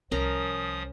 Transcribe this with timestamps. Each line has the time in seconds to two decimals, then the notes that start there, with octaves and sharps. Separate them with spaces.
0.11 C2 F3 C#4 A#4 D#6